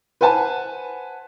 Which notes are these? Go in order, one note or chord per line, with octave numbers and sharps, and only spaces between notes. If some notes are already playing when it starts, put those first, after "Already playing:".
B4 C5 F#5 G#5 A5